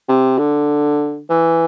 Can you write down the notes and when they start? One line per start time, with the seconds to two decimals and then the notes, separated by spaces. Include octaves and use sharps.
0.09 C3
0.38 D3
1.30 E3